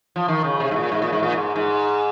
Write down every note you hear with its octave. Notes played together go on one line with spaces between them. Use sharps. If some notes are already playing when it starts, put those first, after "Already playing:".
F3
D#3
C#3
C3
G#2
A#2
G#2
A#2
G#2
A#2
G#2
G#2